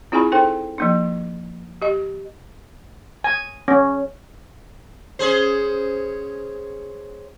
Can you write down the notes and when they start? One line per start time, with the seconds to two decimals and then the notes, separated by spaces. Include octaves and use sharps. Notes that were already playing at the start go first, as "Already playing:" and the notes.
0.12 C4 E4 F4 G#4 G#5 B5
0.32 D#4 A4 C5 G5
0.78 F3 A#3 D#4
1.82 G4 D#5
3.24 G#5
3.68 C#4
5.19 C#4 G#4 C5